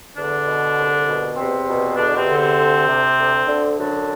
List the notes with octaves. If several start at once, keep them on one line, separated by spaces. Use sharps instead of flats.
E2 D3 D4
B2
C2
B2
E2 C3 C4
B2
E2 D3 D4
C3 C4
D3
C3 C4
D2
C3
D2
D3
F#2 D3 D4